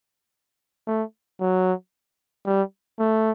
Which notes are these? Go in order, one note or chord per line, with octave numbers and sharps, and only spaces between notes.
A3
F#3
G3
A3